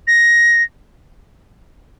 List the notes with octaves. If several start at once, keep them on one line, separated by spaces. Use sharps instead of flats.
A#6